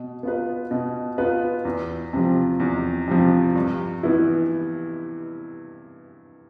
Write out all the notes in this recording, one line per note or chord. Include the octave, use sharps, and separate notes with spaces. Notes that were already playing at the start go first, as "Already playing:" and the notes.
Already playing: B2
B3 F4 B4
B2
B3 F4 B4
E2
C3 F3
E2
C3 F3
G2
E3 B3 E4